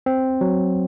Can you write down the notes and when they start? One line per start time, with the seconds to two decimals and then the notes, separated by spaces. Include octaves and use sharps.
0.06 C4
0.41 F#3